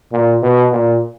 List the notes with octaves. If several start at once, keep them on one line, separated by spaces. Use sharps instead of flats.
A#2
B2
A#2